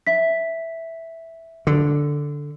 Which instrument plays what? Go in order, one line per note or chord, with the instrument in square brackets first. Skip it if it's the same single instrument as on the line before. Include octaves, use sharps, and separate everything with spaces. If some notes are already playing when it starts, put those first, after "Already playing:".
[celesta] E5 B6
[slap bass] D3